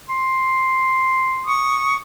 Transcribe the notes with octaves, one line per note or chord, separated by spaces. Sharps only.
C6
C#6 D#6